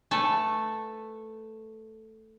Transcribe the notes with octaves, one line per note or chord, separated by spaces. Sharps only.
A3 A4 B4